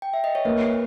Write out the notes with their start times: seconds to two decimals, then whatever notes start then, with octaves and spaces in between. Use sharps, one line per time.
0.02 G5
0.14 E5
0.24 D#5
0.35 C#5
0.45 A#3 B4